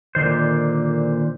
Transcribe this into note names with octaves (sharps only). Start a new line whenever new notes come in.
A#2 D3 D#3 C5